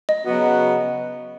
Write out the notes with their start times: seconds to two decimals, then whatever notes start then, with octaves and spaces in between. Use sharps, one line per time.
0.09 D#5
0.25 C#3 F#3 B3 F#4